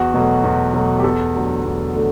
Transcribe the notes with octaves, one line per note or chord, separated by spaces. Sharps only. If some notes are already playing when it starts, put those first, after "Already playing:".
Already playing: E2 F#4
B2 F#3 A3
E2
B2 F#3 A3
G4
E2 A4
D3 F#3 A3
E2
D3 F#3 A3